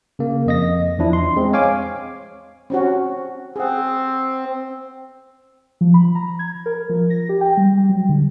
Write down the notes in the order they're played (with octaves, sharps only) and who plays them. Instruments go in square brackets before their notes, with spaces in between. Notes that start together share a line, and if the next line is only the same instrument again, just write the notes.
[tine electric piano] C#3 A#3
F2 D#5 A#6
E2 F3 D4 E4
C6
G#3 C4
C#5 F5 G#5 D6
[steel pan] C4 C#4 F#4
[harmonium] C4 [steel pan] G#4 F#5
[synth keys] F3
B5
A#5
G#6
A#4
F3
A#6
G4
G5
G3
F#3
D3